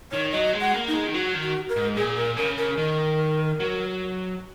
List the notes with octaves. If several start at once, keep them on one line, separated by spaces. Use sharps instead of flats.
D#3 C#5
F#3 D#5
G#3
F#5
A#3
D#4
G#3
D#3
F#3 F#4
D#3
F#4
A#4
G#2
A#2 G#4
A#4
C#3 A#4
A#4
D#3
F#3